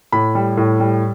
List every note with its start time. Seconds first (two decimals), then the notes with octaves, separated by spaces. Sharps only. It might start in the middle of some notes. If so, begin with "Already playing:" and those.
0.12 A2 B5
0.35 G3
0.57 A2
0.80 G3